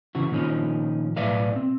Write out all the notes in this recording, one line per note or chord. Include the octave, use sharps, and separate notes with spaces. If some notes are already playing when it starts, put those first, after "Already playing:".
C#3 E3 F#4
A#2 D#3 F3 C#4
B1 A2 B4 D5 E5 F5
C4